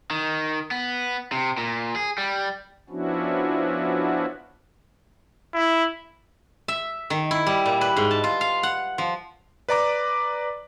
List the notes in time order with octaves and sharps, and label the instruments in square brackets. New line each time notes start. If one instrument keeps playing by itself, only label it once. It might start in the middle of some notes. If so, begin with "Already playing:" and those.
[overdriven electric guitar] D#3
B3
C3
A#2
G#4
G3
[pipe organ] F3 B3 C#4 D4 E4 F#4
[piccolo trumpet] E4
[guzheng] E5
D#3
E4
G3
A#2
B4
G#2
A5
F4
F5
F#5
F3
[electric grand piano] B4 D5 A#5 D6